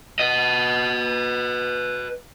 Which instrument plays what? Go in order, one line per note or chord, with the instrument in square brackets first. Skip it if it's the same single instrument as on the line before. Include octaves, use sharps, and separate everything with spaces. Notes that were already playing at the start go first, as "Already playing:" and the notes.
[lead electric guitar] B4 D#5